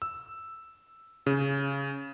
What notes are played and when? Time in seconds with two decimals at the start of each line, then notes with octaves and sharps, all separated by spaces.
0.02 E6
1.27 C#3